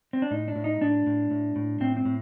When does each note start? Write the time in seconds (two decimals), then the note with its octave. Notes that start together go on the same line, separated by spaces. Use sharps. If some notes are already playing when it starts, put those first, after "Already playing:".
0.13 C4
0.22 D4
0.31 A2 D#4
0.48 D4
0.56 A2
0.64 D#4
0.81 A2 D4
1.07 A2
1.31 A2
1.56 A2
1.81 A2 C4
1.97 C4
2.05 A2